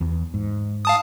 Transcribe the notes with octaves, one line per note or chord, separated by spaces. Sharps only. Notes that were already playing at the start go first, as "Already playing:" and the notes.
E2
G#2
F5 A5 D#6